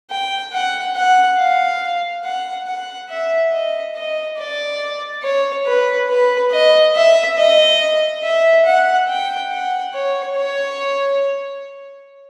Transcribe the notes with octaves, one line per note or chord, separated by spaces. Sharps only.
G5
F#5
F#5
F5
F#5
F#5
E5
D#5
D#5
D5
C#5
B4
B4
D#5
E5
D#5
E5
F#5
G5
F#5
C#5
C#5